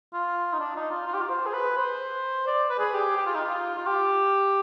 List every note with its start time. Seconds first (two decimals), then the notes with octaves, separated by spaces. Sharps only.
0.13 F4
0.53 D#4
0.60 D4
0.76 D#4
0.91 F4
1.07 F4
1.14 G4
1.21 F4
1.30 C5
1.46 G#4
1.54 B4
1.77 C5
2.47 D5
2.70 B4
2.79 G#4
2.94 G4
3.17 G4
3.26 F4
3.35 D#4
3.44 F4
3.78 F4
3.87 G4